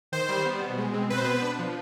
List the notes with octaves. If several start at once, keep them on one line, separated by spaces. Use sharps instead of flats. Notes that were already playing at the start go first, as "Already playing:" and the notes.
D#3 C5
G3
B3
B2
G#3
C4
B2 B4
C5
B3 B4
D4
F3